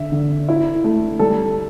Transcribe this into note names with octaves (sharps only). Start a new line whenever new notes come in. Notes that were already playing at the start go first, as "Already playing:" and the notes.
Already playing: D3 E5
D3
E4
A3
G3 A4